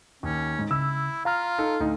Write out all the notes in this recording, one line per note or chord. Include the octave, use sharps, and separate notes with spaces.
D#2 C#4
G#2
C#3 E4 E6
F4 F5 A#5 F6
D#4 A4
D2 D#4